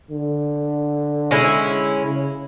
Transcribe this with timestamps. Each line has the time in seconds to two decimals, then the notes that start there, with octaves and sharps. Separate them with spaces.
0.10 D3
1.31 G#3 C#4 E4
2.03 C#3